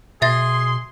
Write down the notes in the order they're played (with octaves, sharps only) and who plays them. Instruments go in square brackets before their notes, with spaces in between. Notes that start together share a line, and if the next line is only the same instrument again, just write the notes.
[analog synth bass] B2 [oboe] G#4 [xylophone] E5 A6 [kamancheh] C6